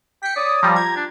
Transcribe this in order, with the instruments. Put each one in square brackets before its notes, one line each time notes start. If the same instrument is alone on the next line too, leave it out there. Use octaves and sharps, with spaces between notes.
[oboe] G5 [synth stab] B6 C#7
[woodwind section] C#5 D#6 [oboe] D5
[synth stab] F3 G3 [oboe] A#5
[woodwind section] F4 G4 [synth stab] G#6
[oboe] D4